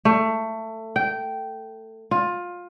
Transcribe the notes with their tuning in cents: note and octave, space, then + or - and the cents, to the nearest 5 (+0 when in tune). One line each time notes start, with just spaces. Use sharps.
A3 +20
G5 -15
F4 +20